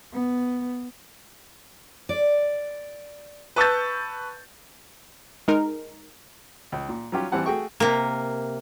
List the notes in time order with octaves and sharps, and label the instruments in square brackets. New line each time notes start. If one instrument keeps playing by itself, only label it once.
[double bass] B3
[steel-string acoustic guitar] D5
[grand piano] B4 A5 C#6 E6 G6 A6
[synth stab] G#3 D#4 A#4
[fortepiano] C#2
A#2
F#3 G3 C#4 F4 G4
E3 G3 C4 F#5 A5
A3 F#4 G#4 G5 C#6
[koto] C3 A#3